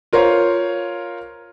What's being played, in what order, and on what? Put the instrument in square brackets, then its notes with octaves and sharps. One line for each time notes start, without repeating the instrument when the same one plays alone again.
[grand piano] F4 A#4 C5 C#5 F5